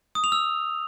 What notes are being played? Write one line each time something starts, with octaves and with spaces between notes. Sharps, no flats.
D#6
F7
E6